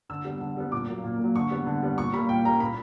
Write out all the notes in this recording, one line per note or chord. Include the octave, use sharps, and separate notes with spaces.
D3 E6
G3 B3
D3
G3 B3
A#2 D6
F#3 A#3
A#2
F#3 A#3
D3 C#6
G3 B3
D3
G3 B3
A#2 C#6
G3 A#3 B5
A#2 G5
G3 A#3 A#5
A#2 B5